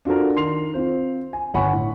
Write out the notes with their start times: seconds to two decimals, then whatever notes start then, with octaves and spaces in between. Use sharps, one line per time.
0.05 D4 F4 F#4 A4 A#4
0.36 D#3 C6 C7 F7
0.74 C4 F4 C5
1.33 G#5
1.54 G1 C#5 F#5 G#5 B5 C#6
1.73 A2